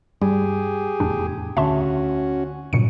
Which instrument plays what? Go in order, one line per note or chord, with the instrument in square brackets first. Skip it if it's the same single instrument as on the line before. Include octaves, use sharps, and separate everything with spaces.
[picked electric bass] G2 [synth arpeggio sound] G3 [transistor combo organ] G4 G#4
[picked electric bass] F1 E2 A2 [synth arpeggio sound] D4
[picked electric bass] D2 D3 [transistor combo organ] C#4 F#4 [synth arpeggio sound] E5 A5 C6
[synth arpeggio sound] G1 A#2 C#7 [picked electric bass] G2 C#3 F#3